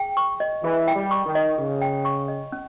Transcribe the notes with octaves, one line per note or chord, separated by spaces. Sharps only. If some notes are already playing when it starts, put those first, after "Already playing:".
Already playing: G#4 G5
C#6
D#5
E3 G#4
G5
G3
C#6
D#3
D#5
C#3 G#4
G5
C#6
D#5
C#4